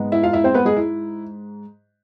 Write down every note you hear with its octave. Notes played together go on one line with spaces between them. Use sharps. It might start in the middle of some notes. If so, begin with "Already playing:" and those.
Already playing: G#2 G#3 B3
E4 E5
F4 F5
E4 E5
C4 C5
B3 B4
G#3 G#4
E4